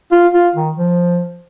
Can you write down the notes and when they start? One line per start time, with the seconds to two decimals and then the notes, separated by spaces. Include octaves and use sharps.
0.12 F4
0.34 F4
0.55 D#3
0.77 F3